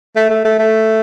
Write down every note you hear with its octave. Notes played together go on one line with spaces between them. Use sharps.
A3
A3
A3
A3